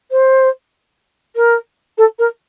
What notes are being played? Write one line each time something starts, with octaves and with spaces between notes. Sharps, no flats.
C5
A#4
A4
A#4